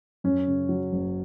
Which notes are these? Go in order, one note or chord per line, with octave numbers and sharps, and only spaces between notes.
F#2 C#4
C#3
F#3
F#1